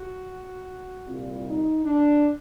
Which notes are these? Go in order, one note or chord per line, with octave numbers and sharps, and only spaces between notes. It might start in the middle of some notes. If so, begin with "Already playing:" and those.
Already playing: F#4
C2 A#2 G3 F4
D#4
D4